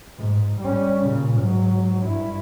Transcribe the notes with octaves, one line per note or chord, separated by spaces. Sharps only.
G#2
G3 C#4
A#2 C#3
G#2 F#3
G2 E4